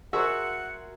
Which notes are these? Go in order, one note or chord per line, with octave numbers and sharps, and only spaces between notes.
F#4 G#4 A#4 C5 E5 F#5